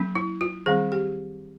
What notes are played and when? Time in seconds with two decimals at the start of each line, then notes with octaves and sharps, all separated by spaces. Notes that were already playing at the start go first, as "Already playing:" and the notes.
Already playing: F#3 A#3 C#4
0.15 E4
0.41 F4
0.66 D#3 G3 C4 G#4
0.92 G4